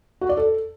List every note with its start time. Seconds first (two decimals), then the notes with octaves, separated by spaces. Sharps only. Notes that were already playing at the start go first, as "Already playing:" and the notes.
0.21 F#4
0.29 D5
0.37 A4